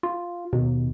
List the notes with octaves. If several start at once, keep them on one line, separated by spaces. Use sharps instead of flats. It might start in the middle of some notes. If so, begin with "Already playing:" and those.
F4
D#2 B2